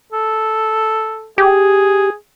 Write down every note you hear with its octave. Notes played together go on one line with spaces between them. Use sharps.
A4
G4 G#4